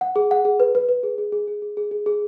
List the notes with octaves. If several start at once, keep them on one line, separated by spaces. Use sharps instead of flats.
F#5
G#4
F#5
G#4
B4
B4
B4
G#4
G#4
G#4
G#4
G#4
G#4
G#4
G#4